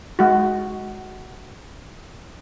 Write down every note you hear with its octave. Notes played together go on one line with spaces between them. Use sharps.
G#3 F#4